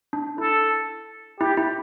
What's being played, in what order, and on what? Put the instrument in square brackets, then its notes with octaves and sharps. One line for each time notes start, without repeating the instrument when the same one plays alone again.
[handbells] D4
[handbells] E4 [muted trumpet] A4
[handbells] E4 [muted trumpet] G4
[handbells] E4